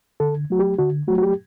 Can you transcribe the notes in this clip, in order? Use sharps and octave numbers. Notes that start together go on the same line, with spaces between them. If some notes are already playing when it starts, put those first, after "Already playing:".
D3 A4
F#3 A3 F#4
G4
D3 F#4
F#3 A3 F#4
F#4
G4